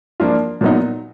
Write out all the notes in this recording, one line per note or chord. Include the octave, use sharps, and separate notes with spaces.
F3 A#3 D4 F4
A#2 F#3 B3 D#4